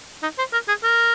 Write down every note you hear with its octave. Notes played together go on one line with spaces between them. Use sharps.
D#4
C5
A#4
G#4
A#4